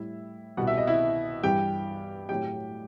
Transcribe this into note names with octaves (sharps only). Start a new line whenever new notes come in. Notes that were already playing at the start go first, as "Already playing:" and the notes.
Already playing: A2 G3 E4 E5
C2 B2 G3 F#5
E5
D#5
E4 E5
G2 E3 G3 G4 G5
A2 F#3 G4 G5